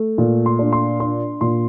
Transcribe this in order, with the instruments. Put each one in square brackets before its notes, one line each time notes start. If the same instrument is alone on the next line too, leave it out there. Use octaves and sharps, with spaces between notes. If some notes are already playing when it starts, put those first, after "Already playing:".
Already playing: [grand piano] A3
A#2
C6
D4
C6
D4 C6
A#2 C6